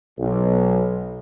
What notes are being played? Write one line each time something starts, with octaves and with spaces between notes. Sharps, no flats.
B1